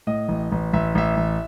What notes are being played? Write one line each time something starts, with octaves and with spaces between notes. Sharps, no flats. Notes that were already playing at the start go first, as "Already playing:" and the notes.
A2 D#5
A1
A1
A1 E5
A1 E5
A1